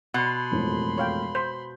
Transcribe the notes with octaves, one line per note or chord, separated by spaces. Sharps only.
B2 F#5 B5 C6
E1 F2 A2
C#5 F5 G5
C5 G6 B6